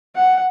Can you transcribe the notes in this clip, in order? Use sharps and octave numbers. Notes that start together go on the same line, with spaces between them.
F#5